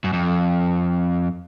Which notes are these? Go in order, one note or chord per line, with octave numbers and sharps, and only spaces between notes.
F#2
F2